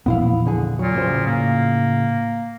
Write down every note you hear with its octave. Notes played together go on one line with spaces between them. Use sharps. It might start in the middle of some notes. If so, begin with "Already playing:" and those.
E1 A#1 B3 E4 F5
F2 D3 G#4
A#2 F#3
A2 C#3 C5
A#3